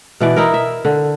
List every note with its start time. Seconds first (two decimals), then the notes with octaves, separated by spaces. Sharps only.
0.21 B2 E3 D5
0.36 D#4 E4 A#4
0.54 E5
0.85 D3